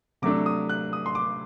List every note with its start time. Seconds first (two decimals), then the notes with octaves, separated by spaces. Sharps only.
0.22 C3 F#3 A3 D4 D6
0.46 D#6
0.69 F#6
0.93 D#6
1.06 C6
1.15 D6